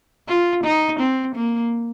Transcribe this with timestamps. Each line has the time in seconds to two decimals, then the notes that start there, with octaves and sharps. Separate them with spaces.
0.28 F4
0.64 D#4
1.00 C4
1.35 A#3